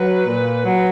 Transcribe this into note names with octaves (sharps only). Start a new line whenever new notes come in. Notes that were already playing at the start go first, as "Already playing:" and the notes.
Already playing: F#3 B4
A#2
F#3